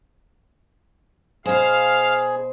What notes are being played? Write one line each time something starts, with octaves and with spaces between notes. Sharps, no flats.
B2 G#4 C5 F5